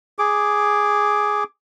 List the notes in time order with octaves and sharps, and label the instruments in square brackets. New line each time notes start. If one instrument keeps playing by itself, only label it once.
[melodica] G#4 D6